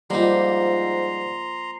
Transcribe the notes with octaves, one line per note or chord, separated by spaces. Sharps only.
G#2 F3 G3 A#3 D#4 A#5 C6